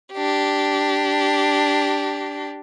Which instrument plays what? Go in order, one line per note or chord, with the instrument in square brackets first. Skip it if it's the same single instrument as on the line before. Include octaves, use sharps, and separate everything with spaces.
[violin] D4 G4